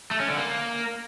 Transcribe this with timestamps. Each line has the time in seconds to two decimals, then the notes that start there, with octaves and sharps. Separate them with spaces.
0.11 A3
0.20 C#4
0.29 D3
0.37 A#3